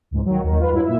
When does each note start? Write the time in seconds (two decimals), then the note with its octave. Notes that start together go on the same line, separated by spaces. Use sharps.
0.11 C#2 G#2
0.26 D#3 F#3
0.43 D#2 D#3
0.60 F4 B4
0.72 G2 F#3 E4
0.85 A#2 E5